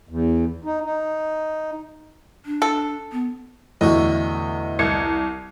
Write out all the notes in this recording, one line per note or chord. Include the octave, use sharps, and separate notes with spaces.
E2
D#4
D#4
D4
A4
B3
E2 A2 D3 F#4 D#5
C2 G#6 C#7